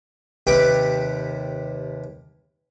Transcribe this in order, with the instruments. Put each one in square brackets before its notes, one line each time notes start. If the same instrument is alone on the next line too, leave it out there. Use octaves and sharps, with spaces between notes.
[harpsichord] D#2 C3 G4 B4 D6